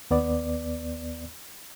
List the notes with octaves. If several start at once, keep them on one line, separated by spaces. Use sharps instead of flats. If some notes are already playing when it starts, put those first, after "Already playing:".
D#2 B3 D5